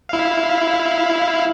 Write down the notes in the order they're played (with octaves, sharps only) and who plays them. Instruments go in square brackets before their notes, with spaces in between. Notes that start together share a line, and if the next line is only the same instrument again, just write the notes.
[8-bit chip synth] E4 F5